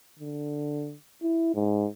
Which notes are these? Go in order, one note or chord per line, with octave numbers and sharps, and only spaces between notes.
D3
E4
G#2